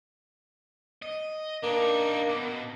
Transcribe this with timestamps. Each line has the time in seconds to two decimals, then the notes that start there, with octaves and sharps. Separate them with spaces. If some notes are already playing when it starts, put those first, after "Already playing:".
1.02 D#5
1.63 A#3 D4 D#4
2.29 B2